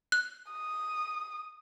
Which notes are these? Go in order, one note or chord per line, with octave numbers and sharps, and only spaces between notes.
F#6
D#6